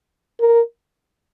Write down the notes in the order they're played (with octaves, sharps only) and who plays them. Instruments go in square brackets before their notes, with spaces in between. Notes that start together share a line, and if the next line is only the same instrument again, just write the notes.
[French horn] A#4